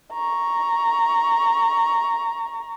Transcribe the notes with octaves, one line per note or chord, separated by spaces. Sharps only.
A#5 C#6